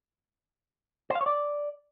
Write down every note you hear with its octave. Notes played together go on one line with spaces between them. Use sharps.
C5
F5
C#5
D5